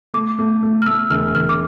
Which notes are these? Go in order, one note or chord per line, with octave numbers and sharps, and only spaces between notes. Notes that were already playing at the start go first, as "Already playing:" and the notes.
A3 D6
A3
A3
F6
A3 E6
E1 F6
E1 F6
D6